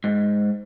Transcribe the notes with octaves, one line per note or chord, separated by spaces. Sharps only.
G#2